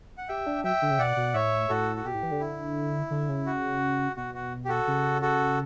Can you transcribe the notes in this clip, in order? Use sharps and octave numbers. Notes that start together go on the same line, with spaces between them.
F#5
G4 E5 G5
D4
F#3 E5 G5
D3
C#3
B2 D5 F#5
B2
A2 C#5 E5
A2 F#4 A4
F#4
B2 G4
A2
E3
D3
E4
D3
C#3
F#4
B2 F#4
F#4
G4
F#4 A4
C#3
F#4 A4